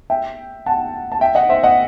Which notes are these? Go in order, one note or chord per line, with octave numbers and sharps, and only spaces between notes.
E5 G5
F#5 A5
A5
E5 G5
D#5 F#5
C5 E5
D#5 F#5